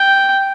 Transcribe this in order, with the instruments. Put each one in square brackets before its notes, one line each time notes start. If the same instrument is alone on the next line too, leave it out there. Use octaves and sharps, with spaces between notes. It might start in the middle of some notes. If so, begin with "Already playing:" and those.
Already playing: [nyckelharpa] G5